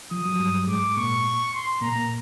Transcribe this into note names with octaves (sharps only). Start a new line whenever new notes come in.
F3 D#6
F#3
G2 G3
G#2 G#3 D6
A#2 A#3 C#6
C6
A#2 A#3 A#5
A#2 A#3